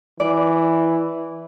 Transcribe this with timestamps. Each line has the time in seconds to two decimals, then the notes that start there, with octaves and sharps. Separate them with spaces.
0.20 E3 D5